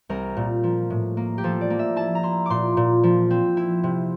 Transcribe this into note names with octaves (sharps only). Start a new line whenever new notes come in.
C2 A#4
A#2
F3
A2
A#3
G4
F3 A4
D5
A#3
E5
E4 A5
A#5
E4 C6
A#2 C6 D6
A#2
F3
C4
E4
C3